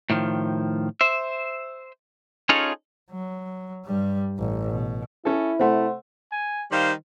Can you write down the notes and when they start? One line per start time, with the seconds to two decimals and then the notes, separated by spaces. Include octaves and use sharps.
0.10 A2 D#3 F3
1.01 C5 E5
2.49 C#4 D#4 F4 G#4 A4 C#5
3.11 F#3
3.86 G2 G3
4.39 A1
4.71 B2
5.25 C#4 E4 A4
5.59 C3 A3 C5 F#5 C6
6.32 G#5
6.72 D#3 G3 C5 F5